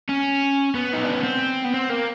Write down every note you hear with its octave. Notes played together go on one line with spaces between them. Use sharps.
C#4
B3
D#4
D4
C#4
C4
B3
C4
A#3